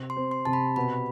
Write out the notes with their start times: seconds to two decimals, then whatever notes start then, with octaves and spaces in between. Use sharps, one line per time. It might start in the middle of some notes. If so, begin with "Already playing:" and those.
Already playing: C3
0.10 C6
0.16 C4
0.31 C6
0.45 C3 A5
0.53 B5
0.76 B2 B5